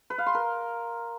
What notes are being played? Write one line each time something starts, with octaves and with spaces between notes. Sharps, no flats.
B4
F5
C6
A#4